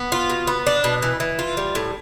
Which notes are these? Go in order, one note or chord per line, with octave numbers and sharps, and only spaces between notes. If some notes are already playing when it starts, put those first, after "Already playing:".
Already playing: B3
F4
B2
B3
D4
B2
E3
E3
F4
G3
A2